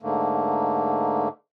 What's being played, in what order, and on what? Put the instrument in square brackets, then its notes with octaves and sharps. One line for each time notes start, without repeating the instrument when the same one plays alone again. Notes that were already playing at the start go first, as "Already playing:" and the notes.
[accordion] G#2 D3 A3 A#3